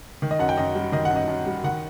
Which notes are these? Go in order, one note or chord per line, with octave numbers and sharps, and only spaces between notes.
D#3
D#5
F#2 F#5
G5
F#2 D#5
G3
D#3 D#5
F#5
F#2
D#5
F#2
G3
D#3 F#5